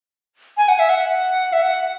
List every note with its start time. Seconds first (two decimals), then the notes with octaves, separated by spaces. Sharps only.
0.57 G#5
0.68 F#5
0.79 E5
0.89 F#5
1.53 E5
1.62 F#5